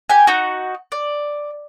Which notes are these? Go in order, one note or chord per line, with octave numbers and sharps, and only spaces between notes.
G4 G#5
D#4 F#4
D5